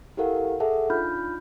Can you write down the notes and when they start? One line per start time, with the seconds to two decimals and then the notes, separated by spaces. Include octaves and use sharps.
0.17 E4 G4 A4 A#4 F5 F#5
0.60 G#4 A4 E5 F#5 A5
0.90 D4 D#4 F4 B5 F6 G6